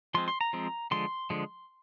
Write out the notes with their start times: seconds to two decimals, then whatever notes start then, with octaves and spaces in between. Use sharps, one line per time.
0.14 F3 G#3 C4 C6
0.28 C6
0.41 A#5
0.53 F3 G#3 C4
0.91 D3 F3 G#3 C6
1.30 D3 F3 G#3